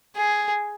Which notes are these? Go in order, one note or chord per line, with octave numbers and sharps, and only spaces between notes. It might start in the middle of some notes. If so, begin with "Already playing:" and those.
G#4